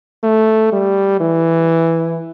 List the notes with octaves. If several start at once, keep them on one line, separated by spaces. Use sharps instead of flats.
A3
G3
E3